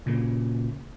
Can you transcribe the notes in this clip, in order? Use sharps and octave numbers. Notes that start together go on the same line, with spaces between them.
A#2 C#3